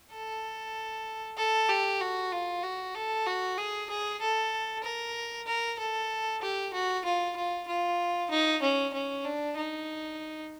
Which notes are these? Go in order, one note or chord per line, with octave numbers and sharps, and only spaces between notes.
A4
A4
G4
F#4
F4
F#4
A4
F#4
G#4
G#4
A4
A#4
A#4
A4
G4
F#4
F4
F4
F4
D#4
C#4
C#4
D4
D#4